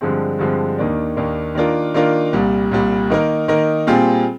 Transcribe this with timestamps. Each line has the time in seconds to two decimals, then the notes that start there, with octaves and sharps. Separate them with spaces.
0.01 G2 D3 F3 G#3 C4
0.39 G2 D3 F3 G#3 C4
0.78 D#2 D#3 A#3 D4
1.16 D#2 D#3 A#3 D4
1.55 D#3 A#3 D4 F4 A#4
1.94 D#3 A#3 D4 F4 A#4
2.33 C2 A#2 G3
2.71 C2 A#2 G3
3.10 D#3 A#3 D#4 A#4
3.48 D#3 A#3 D#4 A#4
3.87 A#2 G3 C4 F4 G#4